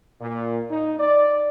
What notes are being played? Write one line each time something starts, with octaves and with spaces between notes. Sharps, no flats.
A#2
D#4
D5